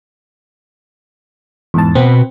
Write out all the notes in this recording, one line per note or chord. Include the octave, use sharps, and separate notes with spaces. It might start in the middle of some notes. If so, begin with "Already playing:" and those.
E2 G#2 A5
B2 B3 C4